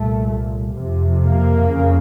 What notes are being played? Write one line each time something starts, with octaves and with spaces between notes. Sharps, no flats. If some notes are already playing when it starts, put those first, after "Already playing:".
Already playing: C2 A#2 A3
F2 C3
A#3
F2 C#3